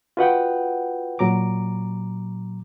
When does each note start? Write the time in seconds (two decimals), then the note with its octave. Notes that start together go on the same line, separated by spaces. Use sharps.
0.17 F4 F#4 B4 D#5 F#5 G5
1.19 A#2 F#3 A#5 D6